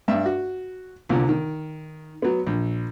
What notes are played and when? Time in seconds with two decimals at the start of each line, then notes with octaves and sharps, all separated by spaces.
0.08 G2 D4 E5
0.26 F#4
1.09 C2 A#2 D3
1.29 D#3
2.22 F#3 B3
2.47 A#1